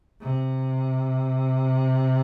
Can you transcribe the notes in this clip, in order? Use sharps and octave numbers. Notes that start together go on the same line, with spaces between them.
C3